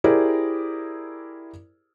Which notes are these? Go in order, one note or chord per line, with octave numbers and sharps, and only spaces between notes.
E4 G4 G#4 A#4 C5 D5